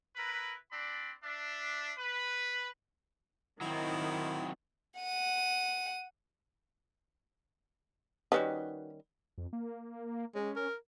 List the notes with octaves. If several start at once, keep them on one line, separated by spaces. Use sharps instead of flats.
E4 A#4 B4
C4 D4 D5 B5
D4 E5
B4
D#3 F#3 C4 E4
F#5 D#7
D#3 G3 C#4 D#4 F#4 B4
F2
A#3
G#3 C#4
A#4